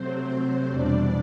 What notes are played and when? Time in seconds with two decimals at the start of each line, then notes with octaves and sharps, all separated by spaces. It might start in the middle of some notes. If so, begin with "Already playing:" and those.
Already playing: C3 F#3 A3 C4 C5
0.27 C4 C5
0.69 E2 B2 G3 D4 D5